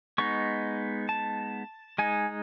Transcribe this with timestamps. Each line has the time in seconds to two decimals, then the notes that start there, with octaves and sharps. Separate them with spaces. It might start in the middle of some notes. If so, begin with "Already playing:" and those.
0.18 G#3 B3 D#4 C#6
1.09 A5
1.98 G#3 D#4 G#5